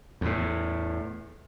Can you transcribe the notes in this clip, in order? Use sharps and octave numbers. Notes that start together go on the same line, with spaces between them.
E2 A2